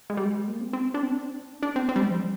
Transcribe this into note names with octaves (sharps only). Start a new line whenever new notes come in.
G#3
G3
G#3
A#3
C4
C4
D4
C4
D4
D4
C4
C4
G3
G#3
F3
G3